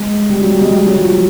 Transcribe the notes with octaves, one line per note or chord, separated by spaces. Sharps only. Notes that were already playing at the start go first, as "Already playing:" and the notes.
Already playing: G#3
G3
F#3
G3
G#3
G3
F#3
F3